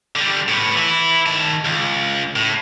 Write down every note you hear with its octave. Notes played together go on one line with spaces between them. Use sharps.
D3 G3
A2 B3
E3 E4
D#3 A5
C#2
A2